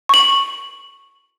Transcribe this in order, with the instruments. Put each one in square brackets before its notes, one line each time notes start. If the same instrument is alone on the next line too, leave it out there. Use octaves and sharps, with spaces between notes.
[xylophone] C#6 F#7